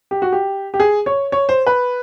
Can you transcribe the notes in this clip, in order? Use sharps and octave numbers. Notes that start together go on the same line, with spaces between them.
G4
F#4
G4
G4
G#4
C#5
C#5
C5
B4